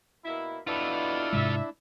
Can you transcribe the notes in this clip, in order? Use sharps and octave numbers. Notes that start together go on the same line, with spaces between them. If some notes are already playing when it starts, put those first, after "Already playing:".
B2 A#3 E4 B5
B2 D4 E4 F4 A4 B4
G#2 C3 G#3 E5